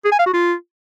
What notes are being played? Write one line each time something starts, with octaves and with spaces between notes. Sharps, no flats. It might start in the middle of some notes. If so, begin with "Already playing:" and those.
G#4
G#5
F5
F#4
F4